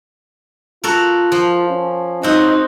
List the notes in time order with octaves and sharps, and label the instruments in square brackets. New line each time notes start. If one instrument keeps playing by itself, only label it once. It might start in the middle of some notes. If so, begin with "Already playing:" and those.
[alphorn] F4 [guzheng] F#4 A4 A#4
[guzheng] F3
[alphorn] C#4
[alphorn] F#3 [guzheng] C4 F#4 [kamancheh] D#4